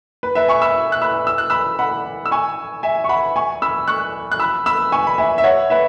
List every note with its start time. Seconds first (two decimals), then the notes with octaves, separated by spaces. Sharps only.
0.23 B4
0.35 B4 E5
0.48 G#5 C#6
0.61 B5 E6
0.92 F#6
1.02 B5 E6
1.27 E6
1.38 F#6
1.50 B5 E6
1.79 F#5 B5
2.26 E6
2.31 G#5 C#6
2.83 E5 G#5
3.04 C#6
3.09 F#5 B5
3.36 G#5 C#6
3.62 B5 E6
3.88 C#6 F#6
4.32 F#6
4.40 B5 E6
4.66 B5 E6
4.92 G#5 C#6
5.07 B5
5.18 E5 G#5
5.38 E5
5.44 C#5 F#5
5.70 B4 E5